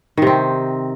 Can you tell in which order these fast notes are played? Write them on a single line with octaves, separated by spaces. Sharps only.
D#3 C3 C4